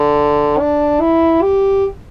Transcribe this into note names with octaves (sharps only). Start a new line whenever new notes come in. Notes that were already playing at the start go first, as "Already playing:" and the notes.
Already playing: D3
D4
E4
G4